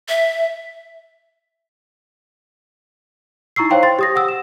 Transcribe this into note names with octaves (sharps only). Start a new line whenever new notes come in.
E5
D#4 E4 A#5 C#6 E6 C7
C5 C#5 F5 G5 C6
C5 C6 A6
G4 D#6 A#6
F#5 D#6 E6
E7